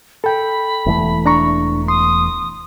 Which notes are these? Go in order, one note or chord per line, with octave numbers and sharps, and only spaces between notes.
A4 G5 B5
E1 E3 A3
D4 A#5 C#6
C6 D#6